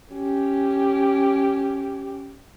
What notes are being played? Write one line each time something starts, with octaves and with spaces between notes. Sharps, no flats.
C#4 G4